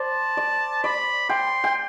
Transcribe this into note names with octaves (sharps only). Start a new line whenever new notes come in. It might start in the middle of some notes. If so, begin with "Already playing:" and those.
Already playing: C5 D5 A5
D5
D5 B5
G5 C6
G5